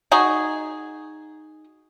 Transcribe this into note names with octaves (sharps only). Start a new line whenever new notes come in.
D#4 F#4 G#4